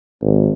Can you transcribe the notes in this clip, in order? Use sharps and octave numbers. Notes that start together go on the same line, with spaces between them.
G#1